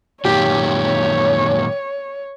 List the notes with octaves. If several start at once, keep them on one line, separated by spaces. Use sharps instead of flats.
F#2 A#2 D#3 G4 C#5